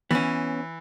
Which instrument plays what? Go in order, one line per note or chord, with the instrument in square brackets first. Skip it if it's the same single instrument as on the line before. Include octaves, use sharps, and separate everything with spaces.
[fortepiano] E3 [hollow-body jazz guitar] B3 C#4